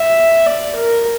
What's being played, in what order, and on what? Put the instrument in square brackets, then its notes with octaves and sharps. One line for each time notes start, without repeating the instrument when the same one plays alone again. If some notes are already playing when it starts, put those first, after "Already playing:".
Already playing: [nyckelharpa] E5
D5
A#4